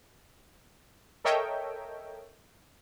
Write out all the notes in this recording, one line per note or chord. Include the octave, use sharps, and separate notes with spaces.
A4 A#4 C#5 D#5 E5 G5